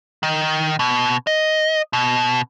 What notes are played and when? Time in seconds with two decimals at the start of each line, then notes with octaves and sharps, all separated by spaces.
0.23 D#3
0.79 B2
1.27 D#5
1.93 B2